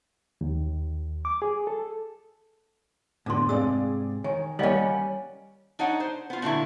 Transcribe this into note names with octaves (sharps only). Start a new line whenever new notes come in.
D#2
D6
G#4
A4
F1 A2 D3 B3 D4 C6 D6
G#2 C3 G#4 D5 F5 E6
D#3 C#5 G#5
G3 A#3 C#4 E4 D#5 F#5 F#7
D4 D#4 C#5 F#5
C5
B3 F4
A#2 D3 F#3 E4